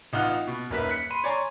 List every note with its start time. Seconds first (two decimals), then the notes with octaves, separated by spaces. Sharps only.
0.13 A1 D#4 F4 F#5 F6 F#6
0.47 B2
0.70 D#1 F#2 A#4 B4 E5 B6
0.89 F#6 B6 C#7
1.10 B5 C6 D#7
1.24 C#5 D5 G#5 A#5 C6 C#6